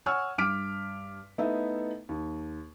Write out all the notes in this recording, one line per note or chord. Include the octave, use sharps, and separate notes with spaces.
C#5 F#5 G#5 C#6 E6 F6
G2 D6 F6 B6 D7
A3 B3 D#4 E4 A4 E5
D#2